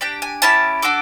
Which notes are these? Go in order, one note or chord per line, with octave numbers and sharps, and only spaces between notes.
D4 G4 G5
G#5
C#4 E4 G4 A5
D4 F#4 A4 D6